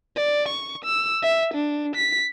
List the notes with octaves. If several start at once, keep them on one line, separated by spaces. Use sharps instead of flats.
D5
C#6
E6
E5
D4
B6